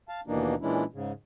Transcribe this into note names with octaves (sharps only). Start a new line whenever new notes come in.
F5 A5
D#2 B2 E3 A#3 D4 D#4
A#2 E3 G#3 C#4 D4 E4
G#2 C#3